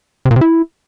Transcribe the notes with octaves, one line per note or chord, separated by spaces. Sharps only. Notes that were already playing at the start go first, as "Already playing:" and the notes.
C3
A#2
C3
E4